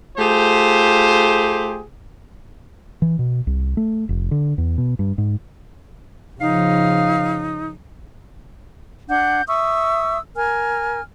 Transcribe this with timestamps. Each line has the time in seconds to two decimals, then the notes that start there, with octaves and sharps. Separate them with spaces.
0.18 A3 F4 G4 G#4 C5
3.02 E3
3.19 B2
3.47 C2
3.77 A3
4.09 F1
4.31 D3
4.58 E2
4.78 B2
4.99 G2
5.18 G#2
6.41 C#3 F3 D#4 F5
9.09 D4 F#5 G6
9.47 E5 C#6 D#6 E6
10.35 A#4 G#5 F6